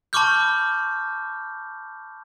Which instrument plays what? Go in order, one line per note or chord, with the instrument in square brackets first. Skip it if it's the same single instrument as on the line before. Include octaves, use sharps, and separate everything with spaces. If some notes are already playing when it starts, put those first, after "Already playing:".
[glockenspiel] A5 B5 C#6 D6 F6 G6